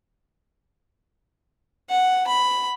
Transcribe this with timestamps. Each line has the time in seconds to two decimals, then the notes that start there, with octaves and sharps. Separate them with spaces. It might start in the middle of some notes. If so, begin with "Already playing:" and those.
1.89 F#5
2.27 B5